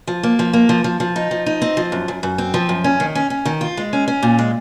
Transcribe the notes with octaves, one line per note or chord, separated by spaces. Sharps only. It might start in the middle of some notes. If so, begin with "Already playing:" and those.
F3
A#3
F3
A#3
F3
F3
F3
D#4
F3
D#4
C4
F3
F#2
F#2
F#2
C4
F3
F#2
C#4
D#3
C#4
C#4
D#3
F4
G#3
C#4
C#4
A#2
G#3